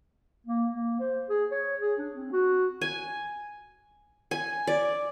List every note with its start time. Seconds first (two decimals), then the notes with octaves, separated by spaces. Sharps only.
0.47 A#3
0.74 A#3
1.00 C5
1.29 G#4
1.51 C#5
1.81 G#4
1.99 D4
2.14 C4
2.32 F#4
2.81 G#5
4.31 G#5
4.67 D5